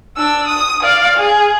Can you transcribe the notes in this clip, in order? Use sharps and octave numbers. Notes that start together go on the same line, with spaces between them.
D4 E6
D#6
D5 F5
G#4